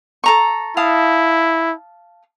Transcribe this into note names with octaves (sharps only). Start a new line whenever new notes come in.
A4 A#5 C#6
E4 F5 A5 D#6